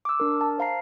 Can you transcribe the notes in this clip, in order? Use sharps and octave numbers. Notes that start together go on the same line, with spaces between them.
D6 E6
D4 A#4
A5
C5 F5 A#5 C7